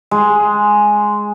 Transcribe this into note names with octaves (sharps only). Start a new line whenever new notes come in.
G#3